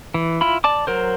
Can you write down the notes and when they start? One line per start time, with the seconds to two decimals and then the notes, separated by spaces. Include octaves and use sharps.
0.14 E3
0.41 E4 F4 B5
0.64 D5 A5 D6
0.87 F#3 A#4 C5